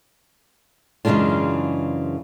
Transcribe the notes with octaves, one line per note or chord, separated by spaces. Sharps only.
F#2 C#3 E3 G#3 D4 F4